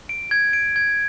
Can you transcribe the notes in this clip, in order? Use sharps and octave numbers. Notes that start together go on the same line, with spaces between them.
D7
G#6
D7
G#6